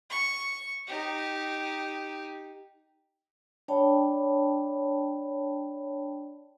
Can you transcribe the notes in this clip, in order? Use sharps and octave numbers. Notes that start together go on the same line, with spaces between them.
C#6
D#4 G4
D4 C#5 D5 G5 A5 B5